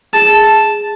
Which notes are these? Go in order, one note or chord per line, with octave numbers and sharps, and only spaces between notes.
G#4 A5